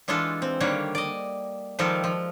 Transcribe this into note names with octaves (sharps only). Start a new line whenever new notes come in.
E3 G#3 D4 F4 A4
C4
D3 D#3 G3 A#3 C#5 F#5
D5 D#5
D#3 F3 G3 G#3 A4 A#4
F3